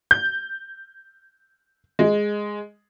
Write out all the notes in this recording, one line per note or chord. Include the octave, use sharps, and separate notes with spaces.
G6
G#3